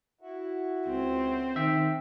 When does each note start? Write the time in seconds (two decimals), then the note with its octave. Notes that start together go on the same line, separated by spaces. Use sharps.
0.21 E4 F#4
0.87 C#2 C4
1.56 D#3 E5 G5